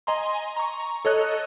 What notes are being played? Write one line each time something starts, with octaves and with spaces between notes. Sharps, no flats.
D#5 G#5 A#5 C6
A#5 C#6
A4 C#5 D#5 F#6